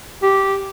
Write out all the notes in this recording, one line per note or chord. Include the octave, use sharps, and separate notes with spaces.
G4